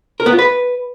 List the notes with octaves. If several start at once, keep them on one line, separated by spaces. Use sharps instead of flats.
A#4
B3
F4
B4